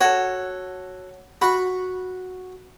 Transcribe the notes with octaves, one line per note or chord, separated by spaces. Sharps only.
F#4 G#4 A4 C#5
F#4 F#5 B5